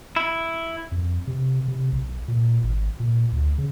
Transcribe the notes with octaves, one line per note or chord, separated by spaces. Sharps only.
E4
F2
C3
C3
B1
A#2
G#1
A#2
D2
C#3